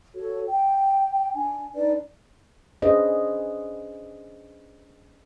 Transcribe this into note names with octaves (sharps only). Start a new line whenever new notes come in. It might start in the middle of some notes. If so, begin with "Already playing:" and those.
F#4 A4 C#5
G5
D4 G#5
D4 D#4 B4 D5
C#4 D4 G#4 B4 C5 D#5